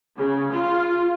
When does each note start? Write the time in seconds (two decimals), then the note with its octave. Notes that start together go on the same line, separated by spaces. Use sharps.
0.18 C#3
0.52 F4